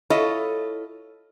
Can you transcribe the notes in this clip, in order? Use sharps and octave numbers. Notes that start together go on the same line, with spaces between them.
E4 F4 A4 C#5 D#5